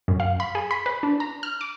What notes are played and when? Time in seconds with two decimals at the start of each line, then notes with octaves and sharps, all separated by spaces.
0.08 F#2
0.20 F5
0.40 B5
0.55 G#4
0.71 B5
0.86 B4
1.03 D4
1.20 A#5
1.43 F6
1.61 D6